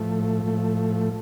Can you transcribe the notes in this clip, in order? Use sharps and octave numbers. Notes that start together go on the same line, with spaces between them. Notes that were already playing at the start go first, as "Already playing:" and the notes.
Already playing: A2 F3 A3
A2 F3 A3